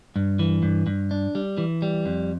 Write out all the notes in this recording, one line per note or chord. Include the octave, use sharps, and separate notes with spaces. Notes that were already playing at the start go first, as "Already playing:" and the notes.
G2
E3
G2
G2
D4
G3
E3
G3
F2